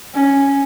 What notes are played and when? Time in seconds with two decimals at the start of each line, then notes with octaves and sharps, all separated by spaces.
0.14 C#4